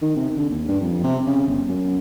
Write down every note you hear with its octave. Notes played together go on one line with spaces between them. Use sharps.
D#3
C3
D3
D#2
G2
F2
C3
C#3
G1
F#2